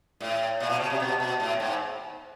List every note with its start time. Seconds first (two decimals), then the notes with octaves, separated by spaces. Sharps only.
0.20 A2
0.60 A#2
0.70 B2
0.80 C#3
0.90 C3
1.00 B2
1.20 B2
1.40 A2
1.60 G#2